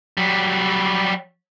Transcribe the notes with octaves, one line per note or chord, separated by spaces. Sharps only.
F#3 G3